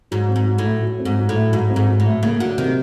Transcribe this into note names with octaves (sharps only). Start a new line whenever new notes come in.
G#2 F#3
C4
G#2
F#3
A2
A3
F#3
C4
G#2
F#3
A2
A3
G#2 F#3
C4
G#2
F#3
A2
A3
C#3 A#3
D3 F#3
C3 D#3